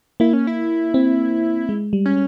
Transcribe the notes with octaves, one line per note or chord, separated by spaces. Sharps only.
A#3 E4
C#4
E4
C4
G#3
G3
C#4